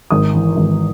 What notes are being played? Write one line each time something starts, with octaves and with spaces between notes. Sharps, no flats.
G#1 D#6
E3
G#1